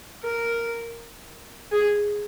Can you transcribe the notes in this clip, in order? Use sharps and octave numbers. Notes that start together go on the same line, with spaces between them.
A#4
G#4